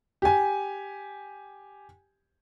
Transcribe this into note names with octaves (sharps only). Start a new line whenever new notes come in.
G4 G#5